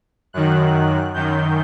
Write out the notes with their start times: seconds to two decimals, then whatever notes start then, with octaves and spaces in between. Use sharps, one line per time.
0.33 F#2 D#3 F#6
1.13 F#2 D#3 G6